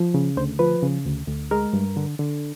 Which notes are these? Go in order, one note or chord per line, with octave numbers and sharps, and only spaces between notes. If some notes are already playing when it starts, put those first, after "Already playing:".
Already playing: F3
C#3
D2 C5
F3 B4
C#3
D2
D2
G#3 A#4
G2
D3
D3